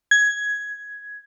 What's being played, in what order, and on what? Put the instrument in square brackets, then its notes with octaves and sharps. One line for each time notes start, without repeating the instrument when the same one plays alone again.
[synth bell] G#6